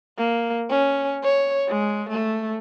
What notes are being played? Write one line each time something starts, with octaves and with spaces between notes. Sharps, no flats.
A#3
C#4
C#5
G#3
A3